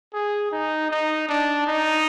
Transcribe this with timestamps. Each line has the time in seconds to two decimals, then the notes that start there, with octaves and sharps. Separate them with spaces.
0.13 G#4
0.52 D#4
0.90 D#4
1.29 D4
1.67 D#4